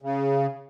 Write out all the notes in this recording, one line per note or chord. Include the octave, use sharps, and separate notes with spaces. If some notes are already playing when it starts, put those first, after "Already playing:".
C#3